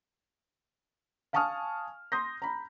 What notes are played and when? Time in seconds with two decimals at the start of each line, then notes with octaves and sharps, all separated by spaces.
1.33 F5 G#5 A5 C#6 D#6 F6
2.12 C6 D#6 G6 A#6
2.42 A#5 B5